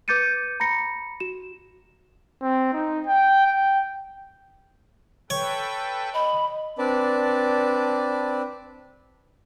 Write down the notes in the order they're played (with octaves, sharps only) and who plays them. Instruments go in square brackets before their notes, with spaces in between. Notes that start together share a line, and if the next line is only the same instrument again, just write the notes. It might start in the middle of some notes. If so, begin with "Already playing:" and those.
[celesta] B4 D6 G6 A6 C#7 D#7
A#5 B5 A#6 C#7
F#4 E7
[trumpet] C4
D#4
G5
G5
[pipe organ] A4 B4 G5 [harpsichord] C#5
[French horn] D#5 [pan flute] B5
[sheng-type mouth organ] C4 D4 B4 D5 A5